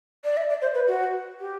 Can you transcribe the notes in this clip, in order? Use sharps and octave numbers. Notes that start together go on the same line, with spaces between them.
D5
E5
D5
C5
B4
F#4
G4